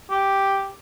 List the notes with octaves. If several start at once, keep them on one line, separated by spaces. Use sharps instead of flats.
G4